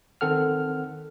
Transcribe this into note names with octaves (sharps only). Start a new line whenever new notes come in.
D#3 C4 A4 F#5 F6